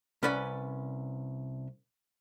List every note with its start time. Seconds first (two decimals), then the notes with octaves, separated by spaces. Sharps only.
0.23 C2 C#4 B4 D5 G#5